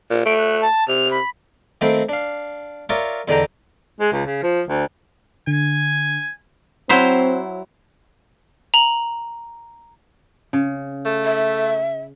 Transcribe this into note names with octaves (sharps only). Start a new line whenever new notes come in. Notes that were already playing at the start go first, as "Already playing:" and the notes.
A#2
A3 D7
F#6
A5
C3 F7
B5
D#3 A3 A#3 C4 G5 B5
D4 F5
F4 A#4 C#5 D5 E5
E2 D3 D4 D#4 G5 A#5
G#3
C#2
C#3
F3
D2
D3 G#5
F#3 C4 E4 C5
A#5 F#7
C#3
A3
E5